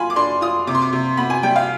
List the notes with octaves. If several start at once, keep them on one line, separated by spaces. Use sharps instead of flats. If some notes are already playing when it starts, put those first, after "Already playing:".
Already playing: F4 G#5 B5 C6
D6
D4 C6
F4 D#6
C3 D6
C6
D6
C3
B3 B5
G#5
G3 G5
F5